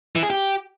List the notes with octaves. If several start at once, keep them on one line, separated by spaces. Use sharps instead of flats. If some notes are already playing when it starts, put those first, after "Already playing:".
E3
G#4
G4